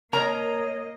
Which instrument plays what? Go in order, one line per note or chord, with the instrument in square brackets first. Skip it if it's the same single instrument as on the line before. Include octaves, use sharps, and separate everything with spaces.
[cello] A#3 D#5 [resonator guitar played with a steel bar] A#4 A#5 [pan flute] C#5